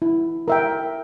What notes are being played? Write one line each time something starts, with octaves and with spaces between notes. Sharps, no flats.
E4
A#4 E5 G5